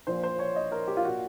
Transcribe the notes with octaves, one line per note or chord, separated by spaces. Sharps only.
A#1 A#2 C5
C5
C#5
D#5
A#4
G4
F4
A#2 F#4